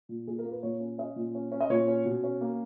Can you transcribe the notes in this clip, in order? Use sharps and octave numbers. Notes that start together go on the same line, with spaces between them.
A#2
A#2 G#4
A#4
A#3
B4
A#2 C#5
C#4
C#4 D#5
A#2
C#4
C#4
D#5
A#2 C#5
C#4
B2
C#4
A#3